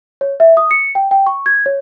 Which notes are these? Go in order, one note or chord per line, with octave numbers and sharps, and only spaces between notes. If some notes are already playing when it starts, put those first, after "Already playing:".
C#5
E5
D#6
C#7
G5
G5
C#6
G#6
C#5